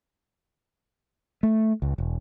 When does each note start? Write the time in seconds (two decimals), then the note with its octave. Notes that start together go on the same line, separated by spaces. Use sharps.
1.43 A3
1.82 C#2
1.98 E1